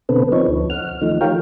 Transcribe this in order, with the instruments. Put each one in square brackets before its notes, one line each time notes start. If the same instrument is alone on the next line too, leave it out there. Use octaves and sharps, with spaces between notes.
[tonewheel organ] B2 D3 B3 C4 A4 B4
F3 C4 D#4 C#5
D2
F#5 F6
D#3 F3 A3 D#4
F4 G4 A#4 C#5 F5 G5